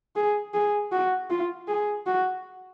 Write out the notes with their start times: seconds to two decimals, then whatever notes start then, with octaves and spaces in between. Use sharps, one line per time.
0.16 G#4
0.54 G#4
0.92 F#4
1.30 F4
1.68 G#4
2.07 F#4